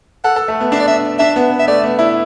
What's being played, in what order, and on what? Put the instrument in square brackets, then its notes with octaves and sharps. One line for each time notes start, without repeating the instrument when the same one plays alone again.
[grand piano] A4 [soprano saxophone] F#5
[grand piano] A4
A3
B3
[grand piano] D4 [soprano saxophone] E5
[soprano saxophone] D5
E5
[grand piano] D4 [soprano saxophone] E5
[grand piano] B3
B3
[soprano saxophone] E5
[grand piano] A3 [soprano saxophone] D5
[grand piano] B3
E4